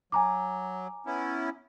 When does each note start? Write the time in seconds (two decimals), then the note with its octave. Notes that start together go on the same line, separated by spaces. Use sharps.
0.12 F#3 G#5 A#5 D6
1.06 B3 C#4 E4